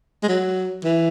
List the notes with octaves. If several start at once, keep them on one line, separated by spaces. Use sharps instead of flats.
G#3
F#3
E3